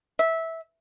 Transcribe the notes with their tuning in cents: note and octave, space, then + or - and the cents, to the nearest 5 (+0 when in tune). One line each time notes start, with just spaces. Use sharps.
E5 -15